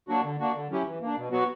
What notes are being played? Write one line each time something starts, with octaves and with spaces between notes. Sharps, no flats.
F#3 A#3 D4 F#4
D3
A#3 D4 F#4
D3
F#3 C#4 E4 G4
E3
A#3 D4
B2
F#3 B3 F#4